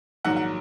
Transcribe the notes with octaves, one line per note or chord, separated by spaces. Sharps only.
A#1 G#2 D#3 F#3 F#5
F#5